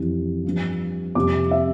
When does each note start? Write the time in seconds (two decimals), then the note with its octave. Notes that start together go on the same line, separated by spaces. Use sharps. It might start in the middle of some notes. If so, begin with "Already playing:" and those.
Already playing: F2 E3 G3
0.44 G2 F3
1.15 F2 C3 G3 D6
1.51 E5